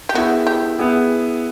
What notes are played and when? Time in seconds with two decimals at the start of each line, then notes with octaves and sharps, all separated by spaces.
0.09 G4
0.14 B3 E4 F#4 G#4
0.47 G4
0.79 B3 E4 G#4